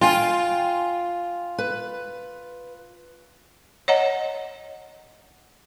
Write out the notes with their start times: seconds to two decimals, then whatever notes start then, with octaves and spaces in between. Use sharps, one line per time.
0.01 F4 G5 G#5
1.58 B4
3.88 C#5 D#5 F#5 A#5